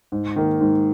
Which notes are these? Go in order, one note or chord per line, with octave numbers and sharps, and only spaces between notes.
G#2
D#3 A#3
G#2